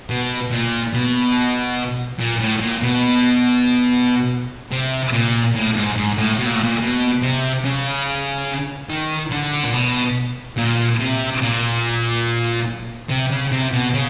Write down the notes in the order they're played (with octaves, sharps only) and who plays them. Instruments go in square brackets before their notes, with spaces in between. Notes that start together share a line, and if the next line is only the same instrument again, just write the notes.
[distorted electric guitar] B2
A#2
B2
A#2
A2
A#2
B2
C3
A#2
A2
G#2
G#2
A2
B2
A#2
A2
A#2
B2
C3
C#3
D#3
D3
A#2
B2
A#2
C3
A#2
C3
C#3
C3
B2
C#3